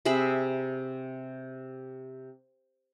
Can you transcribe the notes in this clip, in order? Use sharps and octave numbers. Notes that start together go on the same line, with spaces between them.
C3 G#4 E5 B5